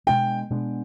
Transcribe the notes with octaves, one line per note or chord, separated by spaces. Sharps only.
B2 G#3 B3 D4 G5
B2 G#3 B3 D4